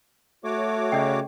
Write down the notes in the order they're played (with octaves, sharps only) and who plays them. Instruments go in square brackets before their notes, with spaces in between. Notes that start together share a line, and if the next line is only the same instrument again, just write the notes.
[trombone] A3 [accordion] F#4 C#5 D6
[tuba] C#3 [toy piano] D5 D#5 G5